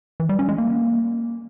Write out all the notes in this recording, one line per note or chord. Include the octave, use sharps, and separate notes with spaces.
E3
G3
C#4
G#3
A#3